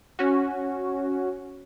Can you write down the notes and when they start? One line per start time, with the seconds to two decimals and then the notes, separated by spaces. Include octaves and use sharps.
0.19 C#4 F#4